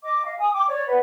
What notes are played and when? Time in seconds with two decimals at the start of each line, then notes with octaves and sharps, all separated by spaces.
0.03 D#5 D6
0.26 D#5 F5
0.39 G#5 D#6
0.54 G5 D6
0.68 C#5 D5
0.88 B4 D5 F#5